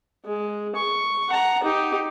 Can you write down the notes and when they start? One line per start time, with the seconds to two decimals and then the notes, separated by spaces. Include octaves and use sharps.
0.25 G#3
0.75 C#6
1.29 F#5 A#5
1.63 D#4 G4